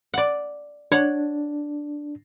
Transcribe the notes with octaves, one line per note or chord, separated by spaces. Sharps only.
D5 F#5
D4 C#5 F#5